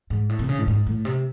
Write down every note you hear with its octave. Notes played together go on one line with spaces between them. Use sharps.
G#2
A2
C3
C#3
A2
G#2
A2
C3